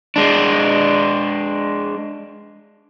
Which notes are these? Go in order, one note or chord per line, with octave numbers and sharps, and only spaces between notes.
G#3 D4